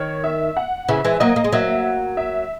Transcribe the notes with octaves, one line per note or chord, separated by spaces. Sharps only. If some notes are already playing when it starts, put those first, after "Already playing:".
Already playing: D#3 C#5
E5
F#5
C#3 E3 E5
E3 G#3
F#3 A#3 D#5
A#3
G#3
F#3 A#3 E5
E5